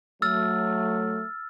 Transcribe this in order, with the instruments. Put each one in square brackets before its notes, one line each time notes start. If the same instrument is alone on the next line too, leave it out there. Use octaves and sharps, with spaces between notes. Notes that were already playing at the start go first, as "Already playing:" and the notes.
[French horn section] F#3 A3 [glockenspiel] E6 F6 A6